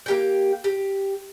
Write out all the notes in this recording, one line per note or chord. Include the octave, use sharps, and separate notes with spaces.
A#3 G4 G5
G4